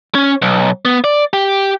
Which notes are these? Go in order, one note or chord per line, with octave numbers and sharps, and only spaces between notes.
C#4
B1
B3
D5
G4